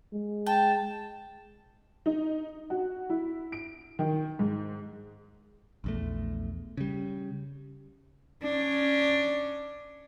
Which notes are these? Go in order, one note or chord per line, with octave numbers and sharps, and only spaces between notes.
G#3
G5 A5
D#4
F#4
E4
D7
D#3
G#2
A#1 E2 A3
C#3 G3
C#4 D4